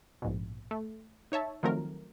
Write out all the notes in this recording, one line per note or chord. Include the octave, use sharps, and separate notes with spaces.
A#1 G#2 B2
A3
D#4 C#5 E5 A5
D#3 F3 F#3 A3 C4 A#4